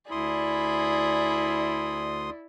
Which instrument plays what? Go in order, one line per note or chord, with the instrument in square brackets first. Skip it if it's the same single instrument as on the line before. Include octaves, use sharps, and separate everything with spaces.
[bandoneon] D2 C6 D#6 [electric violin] E4 [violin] G#4 B5 [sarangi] D5